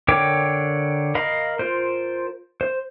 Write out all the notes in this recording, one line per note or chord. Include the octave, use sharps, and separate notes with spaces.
D3 A#4 C#5 G5 D6
A#4 D#5 F5 B5
F4 A#4 C5
C5